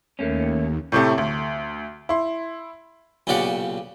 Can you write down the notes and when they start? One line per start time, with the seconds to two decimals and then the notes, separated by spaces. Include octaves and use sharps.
0.19 D#2 A3 A#3 C#4
0.92 A2 C3 A3
1.18 D2
2.09 E4 C6
3.27 B1 A#2 C#3 G4 D5 F#5